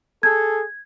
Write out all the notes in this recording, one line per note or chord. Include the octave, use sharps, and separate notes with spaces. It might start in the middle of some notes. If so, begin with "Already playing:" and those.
G#4 A4 G#6